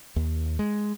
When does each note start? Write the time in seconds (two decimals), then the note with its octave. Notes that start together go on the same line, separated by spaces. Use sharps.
0.16 D#2
0.59 G#3